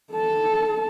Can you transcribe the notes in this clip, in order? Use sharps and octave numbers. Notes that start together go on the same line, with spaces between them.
A4 A5